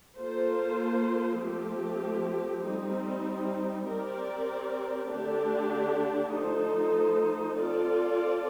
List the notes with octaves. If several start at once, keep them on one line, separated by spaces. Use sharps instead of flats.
A#3 F4 A4 C5
F3 A3 C4 G4
G3 C4 D#4
C4 G4 A#4 D5
D3 A3 D4 G4 D5
F3 A3 D#4 A4 C5
C4 F4 A4 D5